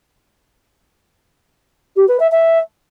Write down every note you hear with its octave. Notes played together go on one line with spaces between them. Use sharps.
G4
B4
E5
E5